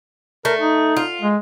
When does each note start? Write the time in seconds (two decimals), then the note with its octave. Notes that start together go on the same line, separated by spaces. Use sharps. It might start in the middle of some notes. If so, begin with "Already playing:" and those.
0.45 A3 A#4
0.59 D#4
0.97 F4
1.21 G#3